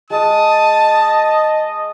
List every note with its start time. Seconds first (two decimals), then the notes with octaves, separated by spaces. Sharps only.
0.10 G#3 A5 D#6
0.82 D#5